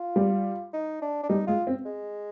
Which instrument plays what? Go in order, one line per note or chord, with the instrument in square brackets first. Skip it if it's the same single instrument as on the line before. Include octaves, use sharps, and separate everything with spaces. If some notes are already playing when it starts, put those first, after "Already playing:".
Already playing: [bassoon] F4
[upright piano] G3
[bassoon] D#4
D4
D4
[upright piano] G3 [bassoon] D#4
[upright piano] G#3 [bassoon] F4
[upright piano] C4
[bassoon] G#3